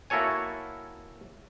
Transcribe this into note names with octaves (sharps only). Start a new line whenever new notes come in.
A#3 E4 F#4 A4 C#5 G#5